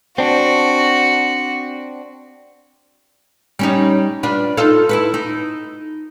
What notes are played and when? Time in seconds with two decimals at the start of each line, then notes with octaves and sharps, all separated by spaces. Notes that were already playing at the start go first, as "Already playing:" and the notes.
0.18 C4 D4 F#4
3.59 G3 C#4 D#4
4.23 D4 F4 B4
4.57 D#4 F4 A4
4.89 E4 A4 B4
5.14 D#4